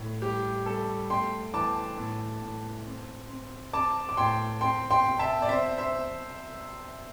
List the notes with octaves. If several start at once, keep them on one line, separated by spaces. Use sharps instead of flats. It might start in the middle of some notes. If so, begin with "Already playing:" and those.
Already playing: A2
G3 G4
G3 A4
A3 G5 C6
E3 A5 D6
A2
A2
C4
C4
C4 A5 D6
D6
A2 G5 C6
C4 G5 C6
G5 C6
C3
E5 A5
D5
C4 C5 E5
C5 E5